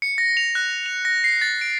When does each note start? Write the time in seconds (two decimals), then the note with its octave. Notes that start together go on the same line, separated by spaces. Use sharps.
0.02 C#7
0.18 A#6
0.37 F7
0.55 F#6
0.86 F7
1.05 A#6
1.24 C7
1.41 A6
1.61 D7